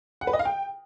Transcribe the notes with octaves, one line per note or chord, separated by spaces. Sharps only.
F#5
B4
D#5
F5
G5